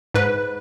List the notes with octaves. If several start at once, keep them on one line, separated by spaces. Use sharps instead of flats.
G#2 B4